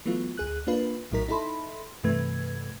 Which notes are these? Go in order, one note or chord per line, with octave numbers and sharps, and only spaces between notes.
E3 F#3 A3 B3 F4
D2 G#4 F#6
A#3 D4 F4 B4
A#1 A2 F#3 D#4 A#4 B6
D#4 E4 A4 B5 C6
G2 C3 E3 A3 B4 G#6